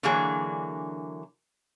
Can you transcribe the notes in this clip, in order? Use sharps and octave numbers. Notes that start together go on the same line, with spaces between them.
D3 E3 F#3 A#3 D4 G#4